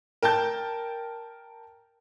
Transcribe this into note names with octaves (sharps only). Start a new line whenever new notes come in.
A#4 G5 A5 G6